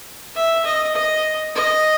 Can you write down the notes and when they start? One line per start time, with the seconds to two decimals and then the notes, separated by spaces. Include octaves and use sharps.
0.36 E5
0.65 D#5
0.95 D#5
1.55 D#5